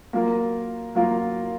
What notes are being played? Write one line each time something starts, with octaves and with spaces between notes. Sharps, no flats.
F#3 A#3 F4 A#4
F#3 A#3 F4 A#4